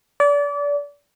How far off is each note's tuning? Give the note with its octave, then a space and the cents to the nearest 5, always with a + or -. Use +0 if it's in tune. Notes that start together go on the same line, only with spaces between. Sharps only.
D5 -30